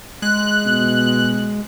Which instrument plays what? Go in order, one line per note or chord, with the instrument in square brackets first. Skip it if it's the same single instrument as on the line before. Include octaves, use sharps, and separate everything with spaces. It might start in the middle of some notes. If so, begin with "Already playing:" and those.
[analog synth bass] G#3 [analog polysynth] F#6
[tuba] B2